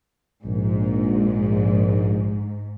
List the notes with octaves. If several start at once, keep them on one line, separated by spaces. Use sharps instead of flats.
A#1 G#2